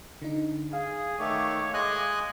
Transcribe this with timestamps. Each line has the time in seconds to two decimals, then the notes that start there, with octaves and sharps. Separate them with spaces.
0.22 D3 D#4
0.73 G#4 F5
1.19 D#3 A3 C#5 D6
1.74 G#3 D#5 G#5 F#6